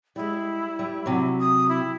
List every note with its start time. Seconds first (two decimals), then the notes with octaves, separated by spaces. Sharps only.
0.16 G3 G#3 E4
0.79 G3
1.06 C3 F#3
1.39 D#6
1.69 E4